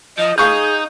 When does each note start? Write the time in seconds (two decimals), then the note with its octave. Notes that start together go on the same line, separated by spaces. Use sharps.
0.18 F3 D#5
0.38 D#4 G#4 F5 C#6 F#6 G6